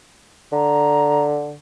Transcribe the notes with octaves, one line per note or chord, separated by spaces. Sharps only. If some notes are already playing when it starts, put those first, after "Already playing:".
D3 A#5